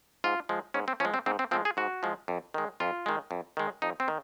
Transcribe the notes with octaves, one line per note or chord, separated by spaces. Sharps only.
G#2 F4
F3 G#3
G#2 C#4
C4
F3 G#3 C#4
C4
G#2 C4
C4
F3 G#3 C4
G#4
G#2 F#4
F3 G#3
F2
D#3 G#3
F2 F4
D#3 G#3
F2
D#3 G#3
F2 D#4
C4
D#3